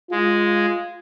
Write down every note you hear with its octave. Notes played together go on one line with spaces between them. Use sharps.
G#3 F4